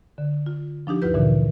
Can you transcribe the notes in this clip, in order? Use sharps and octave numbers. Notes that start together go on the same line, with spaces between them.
D3
F4
F3 D4 D#4 G4
D2 G2 E4 F4 B4 G6
A#2 D3 E3